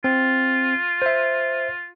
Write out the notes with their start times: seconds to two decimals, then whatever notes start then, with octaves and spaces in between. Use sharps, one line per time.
0.04 C4 F4
1.02 C5 E5